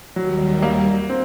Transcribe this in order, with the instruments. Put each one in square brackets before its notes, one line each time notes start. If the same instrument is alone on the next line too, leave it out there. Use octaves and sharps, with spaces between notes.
[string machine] D#2 D#3 G3 [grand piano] F#3
[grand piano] A#3
C4